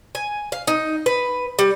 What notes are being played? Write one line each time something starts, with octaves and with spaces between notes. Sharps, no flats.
G#5
F5
D#4
B4
G3